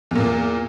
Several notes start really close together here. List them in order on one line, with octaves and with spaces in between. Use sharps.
E2 A#2 A#3